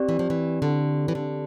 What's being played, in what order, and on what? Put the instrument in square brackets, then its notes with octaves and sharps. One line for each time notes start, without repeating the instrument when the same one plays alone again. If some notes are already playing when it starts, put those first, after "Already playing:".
Already playing: [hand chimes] C4 G4 D5
[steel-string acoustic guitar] E3
F3
E3
D3
E3
D3